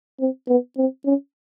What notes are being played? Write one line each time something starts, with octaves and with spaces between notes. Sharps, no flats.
C4
B3
C4
C#4